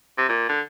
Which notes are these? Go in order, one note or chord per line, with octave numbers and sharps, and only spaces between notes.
C3
A#2
D3